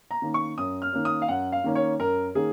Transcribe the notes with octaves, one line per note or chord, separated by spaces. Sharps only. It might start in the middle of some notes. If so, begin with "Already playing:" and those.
A#5
D#3 A#3 C#4
C#6
F#2 D#6
F6
D#3 A#3 C#4
D#6
F5
F#2 F#5
F5
D#3 A#3 C#4
C#5
F#2 A#4
D#3 A#3 C#4 G#4